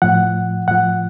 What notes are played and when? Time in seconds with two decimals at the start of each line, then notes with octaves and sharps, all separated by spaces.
0.02 A2 F3 F#5
0.68 A2 F3 F#5